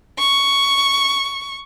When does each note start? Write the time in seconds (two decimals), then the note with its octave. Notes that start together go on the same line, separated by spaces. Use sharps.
0.18 C#6